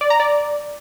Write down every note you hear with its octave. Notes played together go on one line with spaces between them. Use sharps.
D5
A#5
D5